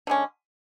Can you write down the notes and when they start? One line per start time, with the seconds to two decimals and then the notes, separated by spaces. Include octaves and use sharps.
0.07 D3 G#3 C#4